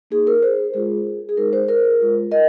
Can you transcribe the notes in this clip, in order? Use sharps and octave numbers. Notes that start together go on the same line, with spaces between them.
A#3 D#4 G#4
A#4
G#4 C5
G#3 F4 G#4
G#4
G#3 D#4 A#4
G#4 C5
A#4
G#3 F4
A#4 D#5